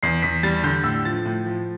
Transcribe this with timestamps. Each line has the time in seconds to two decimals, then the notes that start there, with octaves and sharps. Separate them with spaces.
0.03 E2 C7
0.22 E2 B6
0.43 G3 A6
0.63 D3 G6
0.84 A2 E6
1.05 F3 A6
1.25 A2
1.45 F3